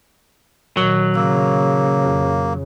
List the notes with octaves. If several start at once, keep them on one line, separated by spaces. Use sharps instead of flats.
A#2 D#3 F#3
C#3 A#3 E6
F2